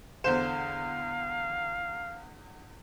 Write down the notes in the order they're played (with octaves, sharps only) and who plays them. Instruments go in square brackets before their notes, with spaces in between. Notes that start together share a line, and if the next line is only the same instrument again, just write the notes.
[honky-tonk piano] E2 D3 E7 [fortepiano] C5 [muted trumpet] F5